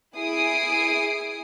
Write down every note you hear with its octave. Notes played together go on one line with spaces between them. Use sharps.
E4 G#4 G#5 D#6 C7 D7